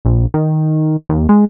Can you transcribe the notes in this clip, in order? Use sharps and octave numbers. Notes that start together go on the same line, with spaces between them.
A#1
D#3
D#2
G#3